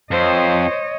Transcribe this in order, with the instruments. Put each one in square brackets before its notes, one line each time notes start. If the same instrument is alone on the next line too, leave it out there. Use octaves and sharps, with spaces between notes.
[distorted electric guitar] F2 [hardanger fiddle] C5 [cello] C#5 D#5